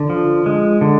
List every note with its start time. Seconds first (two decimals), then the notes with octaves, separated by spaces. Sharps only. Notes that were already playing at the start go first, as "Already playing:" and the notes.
Already playing: D3
0.10 F3
0.46 G#3
0.81 D3